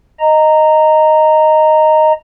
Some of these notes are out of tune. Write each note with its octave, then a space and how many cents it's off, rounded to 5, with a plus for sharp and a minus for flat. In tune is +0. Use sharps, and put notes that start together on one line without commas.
D#5 +0 A#5 -10